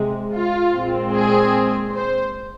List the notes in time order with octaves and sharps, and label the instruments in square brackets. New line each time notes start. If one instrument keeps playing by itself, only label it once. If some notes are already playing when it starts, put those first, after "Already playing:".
Already playing: [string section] C3 G#3 C4
F4
A#2 G#3 C4
G#4
C5